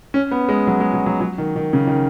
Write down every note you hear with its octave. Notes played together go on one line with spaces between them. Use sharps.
C#4
B3
G#3
F#3
G#3
F#3
F#3
F#3
D#3
D#3
C#3
D#3